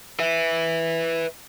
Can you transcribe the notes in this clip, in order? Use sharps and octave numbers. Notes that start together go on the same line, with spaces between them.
B4 E5